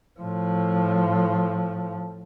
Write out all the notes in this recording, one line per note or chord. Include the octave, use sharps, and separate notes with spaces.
A2 F3